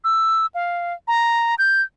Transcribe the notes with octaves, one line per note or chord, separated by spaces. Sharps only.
E6
F5
A#5
G6